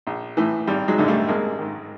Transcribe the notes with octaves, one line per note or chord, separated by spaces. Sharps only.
A#1
A2 E3
G#1 G3
F#3 G#3
F#2 D3
G3 A3
G#1 G#3 A#3
G#2 D#3